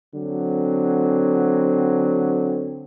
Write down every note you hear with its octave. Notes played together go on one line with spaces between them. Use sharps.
D3 F#3 C4